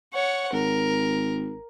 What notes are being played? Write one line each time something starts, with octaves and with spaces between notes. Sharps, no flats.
C#5 F#5
G#1 A#4